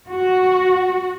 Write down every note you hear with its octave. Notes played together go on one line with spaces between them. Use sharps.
F#4